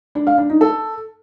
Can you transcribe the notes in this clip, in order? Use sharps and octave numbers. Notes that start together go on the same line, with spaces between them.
D4
F5
D4
D#4
A4